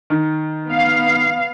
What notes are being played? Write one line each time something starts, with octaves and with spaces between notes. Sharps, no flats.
D#3
B3 F5